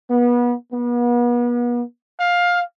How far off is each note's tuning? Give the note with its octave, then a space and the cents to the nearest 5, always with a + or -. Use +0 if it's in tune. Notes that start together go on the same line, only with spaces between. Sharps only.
B3 -30
B3 -40
F5 +15